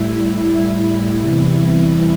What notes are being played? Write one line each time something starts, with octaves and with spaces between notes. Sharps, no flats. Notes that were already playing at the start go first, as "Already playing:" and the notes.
Already playing: A2 G3 E4
E2 C3 E3 G3